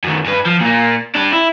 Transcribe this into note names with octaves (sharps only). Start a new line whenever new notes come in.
F#2 D#3
G2 B4
F3
A#2 A#3
D4 G4
E4